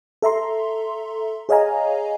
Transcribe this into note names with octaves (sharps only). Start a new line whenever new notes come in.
A4 E5 A#5 C6
G#4 C#5 D#5 F5 G#5 A#5